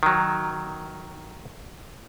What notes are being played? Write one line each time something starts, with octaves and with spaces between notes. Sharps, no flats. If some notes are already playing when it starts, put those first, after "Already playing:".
D#3 F#3